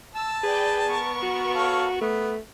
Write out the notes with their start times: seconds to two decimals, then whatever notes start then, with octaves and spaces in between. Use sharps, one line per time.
0.15 A5 E6
0.43 G#4 B4 D5 G5
0.84 B3 A#4 C#6
1.22 F#4
1.55 A4 C#5 F5
2.01 A3 B3